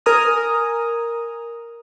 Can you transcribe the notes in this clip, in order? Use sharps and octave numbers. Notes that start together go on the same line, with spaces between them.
A#4 G#5 A#5 D#6 F6